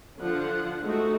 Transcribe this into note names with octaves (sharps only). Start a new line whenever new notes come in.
D3 F3 F4 F#5
G#3 A3 D#4 F#4